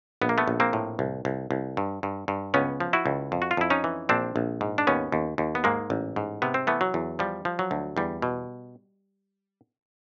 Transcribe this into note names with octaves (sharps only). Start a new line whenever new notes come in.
A#1 B3
A#3
A3 B3
A#1
A#3 C4
A2
C2
C2
C2
G2
G2
G2
C#2 B3 C#4
F3
E4 F#4
C#2
F2
F#4
F4
F2 E4
C#4 D#4
E3
A#1 C4 D4
A#1
G#2
D4
D#2 B3 C#4
D#2
D#2
B3
G#2 G#3 A#3
A1
G#2
C3 B3
C4
E3 A3 B3
F#3
E2
F3 G3
F3
F#3
D2
E2 G3
B2